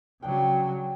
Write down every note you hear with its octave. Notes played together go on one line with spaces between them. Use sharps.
C#3 F#3 D4 F#5 G5